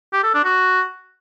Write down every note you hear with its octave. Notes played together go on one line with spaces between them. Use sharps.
G4
A4
D4
F#4